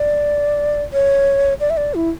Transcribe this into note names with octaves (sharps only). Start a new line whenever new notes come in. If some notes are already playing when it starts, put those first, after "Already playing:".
Already playing: D5
C#5
D5
E5
D5
E4